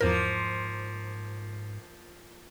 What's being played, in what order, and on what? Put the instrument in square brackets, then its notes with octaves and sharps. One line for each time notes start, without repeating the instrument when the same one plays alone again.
[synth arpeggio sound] E2 A#4 [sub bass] G#2 [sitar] F3 A#3